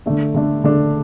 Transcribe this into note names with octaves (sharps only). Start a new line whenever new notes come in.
D3 A3 D4
D3 A3 D4
D3 A3 D4